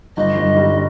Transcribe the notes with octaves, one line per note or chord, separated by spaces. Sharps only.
G1 D#5
G1
G3